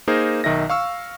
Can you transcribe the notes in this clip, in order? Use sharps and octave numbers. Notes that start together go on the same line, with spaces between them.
A#3 D#4 G#4 A#4 C5
B1 D#3 D#5 E5 A#6
F5 C#6 E6